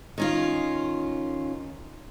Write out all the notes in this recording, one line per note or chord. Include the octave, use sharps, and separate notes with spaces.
D#3 C#4 F4